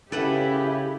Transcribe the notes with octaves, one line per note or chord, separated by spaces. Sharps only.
C#3 E4 G4 A4 B4 F#5